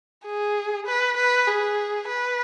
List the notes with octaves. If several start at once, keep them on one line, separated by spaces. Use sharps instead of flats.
G#4
B4
B4
G#4
B4